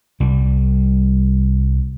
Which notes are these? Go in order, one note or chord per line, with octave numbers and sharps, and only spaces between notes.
C2 G3